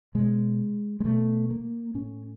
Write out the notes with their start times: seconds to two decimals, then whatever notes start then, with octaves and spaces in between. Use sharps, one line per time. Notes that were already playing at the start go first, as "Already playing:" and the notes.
0.15 B2 G#3
1.00 G#3
1.04 B2 A3
1.50 A#3
1.94 A2 C#4